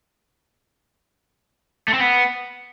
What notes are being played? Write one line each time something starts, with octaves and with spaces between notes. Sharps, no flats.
A3
C4
B3